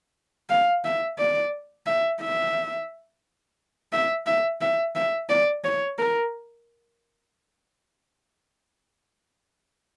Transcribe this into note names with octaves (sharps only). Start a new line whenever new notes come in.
F5
E5
D5
E5
E5
E5
E5
E5
E5
D5
C#5
A#4